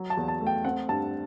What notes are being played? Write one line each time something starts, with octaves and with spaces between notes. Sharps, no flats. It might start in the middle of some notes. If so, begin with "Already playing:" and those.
Already playing: F#3
A5
E2
A5
A3
G5
C4 F#5
G2 A5